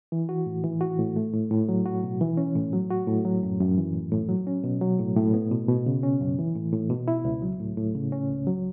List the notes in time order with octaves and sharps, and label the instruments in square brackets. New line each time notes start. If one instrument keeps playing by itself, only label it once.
[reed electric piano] E3
F#4
A2
E3
F#4
A2
A3
A2
A2
F#3
F#4
B2
E3
C#4
A2
F#3
F#4
A2
F#3
F#2
F#2
E3
A2
A2
F#3
C#4
B2
F#3
A2
A2
B3
B2
B2
C#3
C#4
F#2
E3
A2
A2
B2
E4
C#2
F#3
A2
A2
C#3
C#4
C#2
F#3